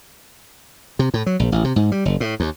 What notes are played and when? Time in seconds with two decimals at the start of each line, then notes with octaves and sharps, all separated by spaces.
0.99 C3
1.14 A2
1.26 F#3
1.40 A#1
1.52 A1
1.64 C3
1.76 G#2
1.92 G3
2.05 F#1
2.20 A2
2.40 D#2